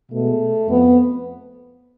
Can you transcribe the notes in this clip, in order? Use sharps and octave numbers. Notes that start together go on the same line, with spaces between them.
B2 G#3 A3
F2 B3